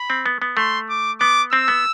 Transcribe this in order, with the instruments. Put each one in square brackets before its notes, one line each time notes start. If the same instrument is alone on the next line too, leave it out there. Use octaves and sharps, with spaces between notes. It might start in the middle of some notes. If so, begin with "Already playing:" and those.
Already playing: [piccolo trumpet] B5
[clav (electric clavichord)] C4
B3
B3
[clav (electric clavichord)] A3 [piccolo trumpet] C6
[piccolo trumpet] D6
[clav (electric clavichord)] B3 [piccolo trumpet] D6
[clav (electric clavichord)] C4 [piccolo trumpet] E6
[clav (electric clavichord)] B3